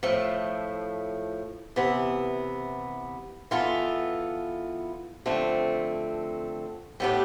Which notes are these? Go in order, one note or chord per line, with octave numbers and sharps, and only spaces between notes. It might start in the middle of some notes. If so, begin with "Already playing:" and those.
A2 F3 A3
C3 E3 B3
E3 B3 F4 A4
F2 D3 A3 C4
A2 G3 B3 D4 G4